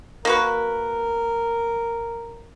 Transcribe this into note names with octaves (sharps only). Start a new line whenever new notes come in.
A#3 F#4 A#4 B4